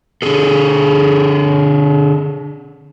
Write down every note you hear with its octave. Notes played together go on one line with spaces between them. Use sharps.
D3 G#4 A4